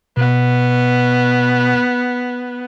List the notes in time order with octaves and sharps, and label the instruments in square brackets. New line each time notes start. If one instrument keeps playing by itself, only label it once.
[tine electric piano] B2 [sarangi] B3